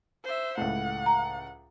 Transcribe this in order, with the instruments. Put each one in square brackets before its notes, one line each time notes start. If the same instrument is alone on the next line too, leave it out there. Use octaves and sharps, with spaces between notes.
[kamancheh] C5 E5
[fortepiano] C#2 A2 [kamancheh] F#5
[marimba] A#5